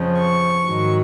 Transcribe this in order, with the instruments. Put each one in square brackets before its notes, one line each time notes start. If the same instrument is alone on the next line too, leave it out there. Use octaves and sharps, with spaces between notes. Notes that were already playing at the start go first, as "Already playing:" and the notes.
Already playing: [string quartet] F2 C#3 F3
C#6
G#2 D#3 F#3